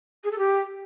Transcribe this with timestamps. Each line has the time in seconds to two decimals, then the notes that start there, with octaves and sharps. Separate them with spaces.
0.24 G#4
0.31 A4
0.38 G4